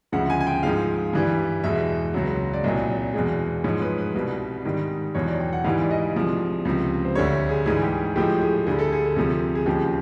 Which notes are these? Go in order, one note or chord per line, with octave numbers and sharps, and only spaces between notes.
D2 C#3 F3 G#3 F#5
G#5
G#5
G5
G#2 F3 G#3 F5
G2 E3 G3
E2 B2 G#3 E5
C#2 C#3 F#3
D5
C2 A#2 F#3 D#5
E2 B2 G#3
G#2 F3 G#3 C#5
B4
B4
C2 B2 G3
G#2 D#3 G3
E2 B2 F#3 C#5
D5
G5
F#5
G#2 E3 G3 F5
D5
D#5
C2 C3 F3 G#3
C#2 C3 F3
C5
D2 D3 G3 C#5
G#4
G#2 E3 G3 G#4
G4
A2 F3 G#3 G4
G#4
D2 D3 G3 G#4
A4
G#4
A4
D2 C3 F3 G#4
G#4
D#2 C#3 F3 G#3 G4